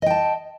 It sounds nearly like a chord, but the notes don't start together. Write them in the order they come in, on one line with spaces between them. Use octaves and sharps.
D#5 G5 A5